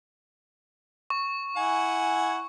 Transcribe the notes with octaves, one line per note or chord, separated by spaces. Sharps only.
C#6
E4 F#5 G#5